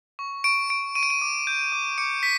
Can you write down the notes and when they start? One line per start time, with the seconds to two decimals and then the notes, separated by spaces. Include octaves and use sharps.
0.19 C#6
0.44 C#6 D7
0.70 C#6 D7
0.95 C#6 D#7
1.03 D7
1.10 D#7
1.22 D6
1.47 G6
1.72 D6
1.98 D6 C#7
2.23 B6